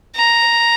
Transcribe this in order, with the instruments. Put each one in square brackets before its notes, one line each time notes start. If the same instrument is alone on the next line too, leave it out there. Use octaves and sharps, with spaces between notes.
[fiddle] A#5